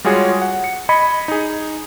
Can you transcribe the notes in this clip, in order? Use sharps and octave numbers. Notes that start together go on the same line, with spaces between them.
G3 G#3 F4 F#4 G#4 C#5
F#5
C#7
D#5 B5 G#6 C#7
D#4 G#4